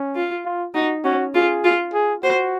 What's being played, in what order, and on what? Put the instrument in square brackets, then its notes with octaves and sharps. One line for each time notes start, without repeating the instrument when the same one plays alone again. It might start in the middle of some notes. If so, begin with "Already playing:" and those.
Already playing: [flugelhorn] C#4
[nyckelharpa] F4
[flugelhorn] F4
[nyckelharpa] D#4 [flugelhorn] F#4
[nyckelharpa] C#4 [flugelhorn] F#4
[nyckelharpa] F4 [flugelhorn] G#4
[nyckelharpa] F4
[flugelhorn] G#4
[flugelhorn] F#4 [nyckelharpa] C5